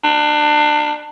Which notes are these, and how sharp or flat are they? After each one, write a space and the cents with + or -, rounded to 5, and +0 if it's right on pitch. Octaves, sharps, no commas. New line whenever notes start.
D4 +25